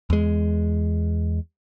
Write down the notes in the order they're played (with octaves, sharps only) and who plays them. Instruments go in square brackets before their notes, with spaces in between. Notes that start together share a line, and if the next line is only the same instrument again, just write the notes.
[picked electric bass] E2 G#3